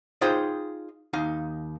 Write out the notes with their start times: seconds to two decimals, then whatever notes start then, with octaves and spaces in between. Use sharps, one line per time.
0.21 D#4 F4 G#4 C5 G5
1.13 D#2 D#4 F5